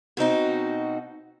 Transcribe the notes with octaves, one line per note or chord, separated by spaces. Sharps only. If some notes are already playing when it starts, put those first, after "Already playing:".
B2 C4 D#4 F#4